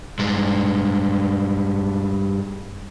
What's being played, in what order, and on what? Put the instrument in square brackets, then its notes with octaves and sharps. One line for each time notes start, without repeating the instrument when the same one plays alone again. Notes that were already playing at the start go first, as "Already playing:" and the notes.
[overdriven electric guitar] G2 G#3